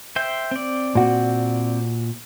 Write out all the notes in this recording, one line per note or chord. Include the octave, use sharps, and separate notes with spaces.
C5 E5 G5
C4 D5
A#2 F#4